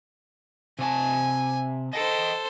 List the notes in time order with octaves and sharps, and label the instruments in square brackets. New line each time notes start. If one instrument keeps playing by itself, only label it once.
[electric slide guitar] C3 C#5 A5 [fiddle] G#5
[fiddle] A4 C5 [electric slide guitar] D#5 G5